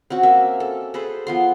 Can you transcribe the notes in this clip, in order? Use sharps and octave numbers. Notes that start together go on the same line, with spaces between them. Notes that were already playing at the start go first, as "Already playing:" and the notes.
C4 C#4 F#4
A#3 E5
A4
G#4 A4 B4 C5
F3 B3 C6